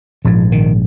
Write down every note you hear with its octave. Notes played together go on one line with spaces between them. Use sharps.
A#1 G#2 F3
D#3